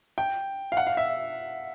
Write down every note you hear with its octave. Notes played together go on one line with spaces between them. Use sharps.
G5
F5
F#5
F5
E5